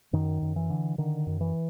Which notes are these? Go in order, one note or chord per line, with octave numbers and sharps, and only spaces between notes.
F#2 D#3
F#2
E3
D3
D3 D#3
F#2
E3